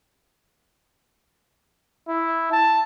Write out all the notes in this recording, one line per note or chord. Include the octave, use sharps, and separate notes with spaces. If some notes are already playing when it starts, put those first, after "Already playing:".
E4
A5